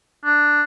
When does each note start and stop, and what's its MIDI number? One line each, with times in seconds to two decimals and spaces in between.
0.25 0.62 62